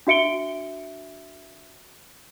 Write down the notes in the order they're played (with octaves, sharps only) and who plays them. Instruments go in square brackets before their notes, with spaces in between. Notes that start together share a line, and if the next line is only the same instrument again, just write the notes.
[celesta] D4 F#4 E5 C#7 D7 G7